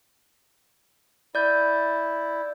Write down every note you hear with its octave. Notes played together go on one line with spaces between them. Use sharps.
E4 D5 G6